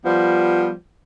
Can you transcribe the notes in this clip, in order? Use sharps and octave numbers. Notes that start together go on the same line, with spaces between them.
F3 G3 B3